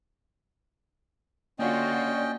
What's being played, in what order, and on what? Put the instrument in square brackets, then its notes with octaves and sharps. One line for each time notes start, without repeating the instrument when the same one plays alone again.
[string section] D3 F4 F#4 [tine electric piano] A#3 [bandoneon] C#4 D#5 G5 [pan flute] D5